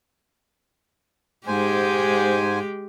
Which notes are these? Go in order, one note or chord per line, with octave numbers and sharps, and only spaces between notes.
G#2 G#3 G4 C5 G#5